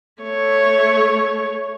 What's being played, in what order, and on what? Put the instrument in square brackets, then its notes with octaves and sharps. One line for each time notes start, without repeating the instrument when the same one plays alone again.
[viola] A3 C#5